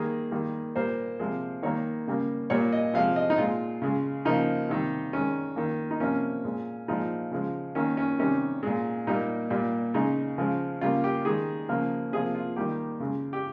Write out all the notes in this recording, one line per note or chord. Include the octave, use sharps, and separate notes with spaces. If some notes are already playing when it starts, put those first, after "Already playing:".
Already playing: D#3 G3 A#3 G#4
D#3 G3 A#3
A#2 G3 A#3 C5
C3 F3 G#3
D#3 G3 A#3 C#5
C#3 G3 A#3
A#2 G3 A#3 C#5
D#5
C3 F3 G#3 F5
D#5
D#4
A#2 G#3 F4
C#3 G#3
C#3 F3 A#3 D#4
C3 D#3 G3
D#3 G#3 C#4
D#3 A#3
D#4
C3 F3 A#3 C#4
A#2 G#3
A#2 F3 G#3 D#4
C#3 F3 G#3
D#3 A#3 C#4
C#4
C3 D#3 G3 C#4
A#2 G#3
A#2 G3 A#3 D#4
A#2 G3 A#3
C#3 G#3 D#4
C#3 F3 G#3
C#3 G3 A#3 F4
G4
D#3 G#3 G#4
C#3 F3 A#3
C3 F3 A#3 G#4
F4
D#3 G3 A#3 G4
C#3 G#3
G4